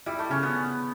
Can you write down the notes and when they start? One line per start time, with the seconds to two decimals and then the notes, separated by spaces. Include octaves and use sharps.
0.06 G3 E4
0.19 A3
0.30 C#3 C#4
0.43 B3